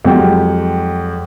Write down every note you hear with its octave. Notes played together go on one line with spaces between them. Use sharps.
F2 F#3 G#3 G4 G5